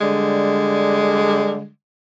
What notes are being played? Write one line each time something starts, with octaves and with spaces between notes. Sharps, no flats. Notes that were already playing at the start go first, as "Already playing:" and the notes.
D3 G3 G#3